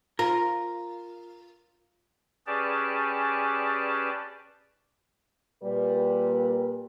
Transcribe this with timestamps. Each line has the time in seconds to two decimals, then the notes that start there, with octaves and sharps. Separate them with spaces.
0.19 F4 A#4
2.47 C#4 G4 G#4 B4 D5 A5
5.63 A#2 G3 B4